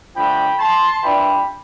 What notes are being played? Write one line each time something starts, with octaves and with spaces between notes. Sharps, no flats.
D3 F3 A3 D4 G5 B5
A5 C6
E3 G3 D4 F4 G5 B5